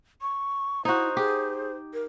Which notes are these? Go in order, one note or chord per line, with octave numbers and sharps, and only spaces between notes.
C#6
D#4 E4 F#4 C5
G4 G#4
A#4